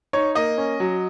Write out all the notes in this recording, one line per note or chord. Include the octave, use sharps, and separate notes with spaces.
D#4 C#5
A#3 D#5
C#4
F#3